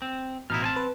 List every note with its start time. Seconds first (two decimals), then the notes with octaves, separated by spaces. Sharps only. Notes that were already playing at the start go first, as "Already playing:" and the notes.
0.02 C4
0.50 A1 B2 D#4 E4 F6
0.62 C4 G#5 A5
0.76 B4